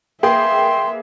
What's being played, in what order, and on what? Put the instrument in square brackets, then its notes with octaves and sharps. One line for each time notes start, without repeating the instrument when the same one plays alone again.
[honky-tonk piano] A#3 G#4 B4 [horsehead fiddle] E5 [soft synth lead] G5 [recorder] C6